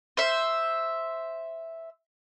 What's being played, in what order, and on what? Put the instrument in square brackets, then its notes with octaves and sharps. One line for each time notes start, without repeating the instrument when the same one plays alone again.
[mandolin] C5 E5